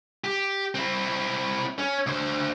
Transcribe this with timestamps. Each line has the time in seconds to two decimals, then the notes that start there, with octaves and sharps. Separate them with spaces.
0.24 G4
0.75 C4 E4
1.79 C#4
2.07 D2 C5